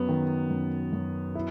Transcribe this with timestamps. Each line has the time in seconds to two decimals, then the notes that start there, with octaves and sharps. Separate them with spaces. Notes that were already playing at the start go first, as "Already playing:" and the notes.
Already playing: F#2 B3
0.09 D#3
0.50 F#2
0.93 F#2
1.35 E4